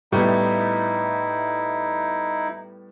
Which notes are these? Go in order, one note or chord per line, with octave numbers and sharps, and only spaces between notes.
A2 G3 B3 D#4 E4